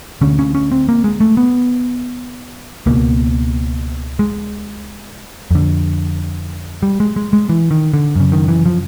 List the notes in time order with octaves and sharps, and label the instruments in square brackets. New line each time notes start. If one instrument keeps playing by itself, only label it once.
[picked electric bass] D2 D3 C#4
C#4
C#4
C4
A#3
G#3
A3
B3
C#2 B2 A#3
G#3
F2 D3
G3
G#3
G#3
G#3
E3
D#3
D3
F#2 C#3
D#3
E3
F3